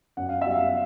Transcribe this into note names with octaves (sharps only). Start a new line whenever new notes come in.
F#2 F#5
F5
G3 E5
F5